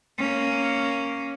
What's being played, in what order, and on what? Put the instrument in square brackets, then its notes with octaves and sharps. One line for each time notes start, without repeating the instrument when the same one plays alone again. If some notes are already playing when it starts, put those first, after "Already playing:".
[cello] A#3 C#4